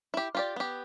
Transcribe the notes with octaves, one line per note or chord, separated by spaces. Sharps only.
E4 G4
F4 G4 D5
B3 G4